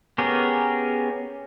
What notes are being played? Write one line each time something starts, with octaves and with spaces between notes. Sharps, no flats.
B3 C#4 G4 G#4 A#4